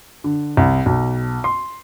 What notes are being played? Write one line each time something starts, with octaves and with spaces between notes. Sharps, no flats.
D3
C2
B1
C6